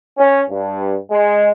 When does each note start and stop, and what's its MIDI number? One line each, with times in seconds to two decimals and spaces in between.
0.18 0.41 61
0.50 0.95 43
1.11 1.51 56